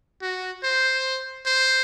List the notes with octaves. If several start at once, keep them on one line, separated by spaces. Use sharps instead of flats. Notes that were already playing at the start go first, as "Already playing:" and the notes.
F#4
C5
C5